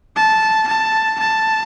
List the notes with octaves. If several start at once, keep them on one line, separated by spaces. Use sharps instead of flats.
A5
A5
A5